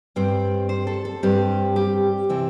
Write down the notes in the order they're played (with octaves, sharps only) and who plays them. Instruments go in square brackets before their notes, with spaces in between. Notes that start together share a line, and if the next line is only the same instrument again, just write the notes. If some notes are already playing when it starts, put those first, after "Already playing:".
[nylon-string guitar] G2 G3 C4 C5
C5
A4
A4
G2 G3 C4 G4
G4
C3 E3 C4